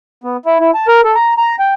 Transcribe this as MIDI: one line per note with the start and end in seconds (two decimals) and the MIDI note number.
0.24 0.37 59
0.46 0.59 64
0.60 0.71 64
0.74 0.87 81
0.88 1.01 70
1.04 1.15 69
1.15 1.34 82
1.38 1.56 82
1.59 1.74 79